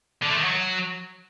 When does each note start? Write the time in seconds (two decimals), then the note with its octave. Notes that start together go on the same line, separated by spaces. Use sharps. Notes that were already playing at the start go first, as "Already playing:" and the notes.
0.22 D3
0.30 A3
0.37 D#3
0.44 F#3